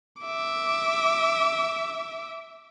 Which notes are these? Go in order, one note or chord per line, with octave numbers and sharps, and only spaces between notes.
E5 D6